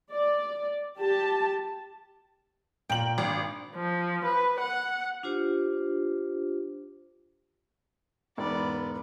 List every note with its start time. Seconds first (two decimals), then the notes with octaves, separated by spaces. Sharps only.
0.11 D5
0.97 G4 A5
2.90 A#2 G5 F#7
3.18 G#1 D4
3.75 F3
4.26 B4
4.61 F#5
5.23 D4 F4 G4 C5
8.38 E1 G#2 B3 D5